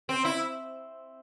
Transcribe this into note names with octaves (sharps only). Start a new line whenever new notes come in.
C4
E4